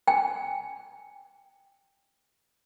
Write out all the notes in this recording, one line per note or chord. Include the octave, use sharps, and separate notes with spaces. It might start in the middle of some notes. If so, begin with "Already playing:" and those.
G5 G#5